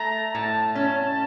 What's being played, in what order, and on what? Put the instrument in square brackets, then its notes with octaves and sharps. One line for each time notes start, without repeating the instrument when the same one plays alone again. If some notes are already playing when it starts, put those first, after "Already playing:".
Already playing: [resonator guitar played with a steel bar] A3 [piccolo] A#5
[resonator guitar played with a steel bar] A2 [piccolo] A5
[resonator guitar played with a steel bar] C#4 [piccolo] A5